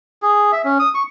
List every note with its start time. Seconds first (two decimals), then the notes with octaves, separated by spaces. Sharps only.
0.22 G#4
0.52 E5
0.64 C#4
0.79 D#6
0.95 C#6